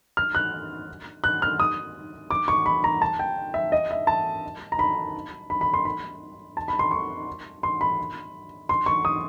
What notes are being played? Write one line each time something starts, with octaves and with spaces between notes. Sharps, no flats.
F6
F#6
F#6
F6
D#6
D6
C#6
B5
A#5
A5
G5
E5
D#5
E5
A5
A#5
B5
B5
B5
C6
B5
A5
B5
C6
C#6
C6
B5
C6
C#6
D#6